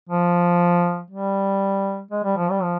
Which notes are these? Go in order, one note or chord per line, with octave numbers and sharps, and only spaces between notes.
F3
G3
G#3
G3
F3
G3
F3